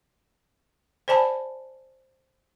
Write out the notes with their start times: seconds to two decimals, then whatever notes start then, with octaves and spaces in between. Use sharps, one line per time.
1.08 C5 D5 G#5 A5 B5